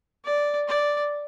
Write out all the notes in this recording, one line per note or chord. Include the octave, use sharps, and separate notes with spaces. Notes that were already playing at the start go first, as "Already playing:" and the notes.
D5
D5